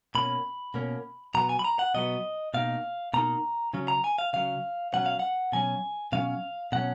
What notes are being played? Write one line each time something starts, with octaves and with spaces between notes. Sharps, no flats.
B2 A#3 C#4 B5
B2 A#3 C#4
B2 F#3 B3 A#5
G#5
B5
A#5
F#5
B2 F#3 B3 D#5
B2 A#3 D#4 F5
B2 A#3 D#4 A#5
C#3 F#3 C#4
A#5
G#5
F5
C#3 F#3 C#4 F5
B2 F#3 C#4 F#5
F5
F#5
B2 F#3 C#4 G#5
B2 F#3 C#4 F5
B2 F#3 C#4 F#5